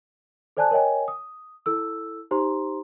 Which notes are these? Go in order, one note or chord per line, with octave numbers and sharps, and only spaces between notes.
A4 C5 D5 G#5 A5 F#6
A#4 C#5 D#5 G5 G#5
D#6
E4 A4 E6
D#4 G4 C5 A#5 C6